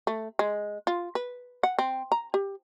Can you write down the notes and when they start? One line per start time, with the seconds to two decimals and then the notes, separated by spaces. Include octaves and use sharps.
0.07 A3
0.39 G#3
0.87 F4
1.15 B4
1.63 F#5
1.79 C4
2.12 A#5
2.34 G4